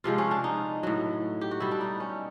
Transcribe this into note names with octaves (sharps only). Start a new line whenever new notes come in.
C3 F3 G#3 F4
C#4
D4
D#4
A2 F#3
G4
F#4
B2 G3 E4
D4
D#4
C#4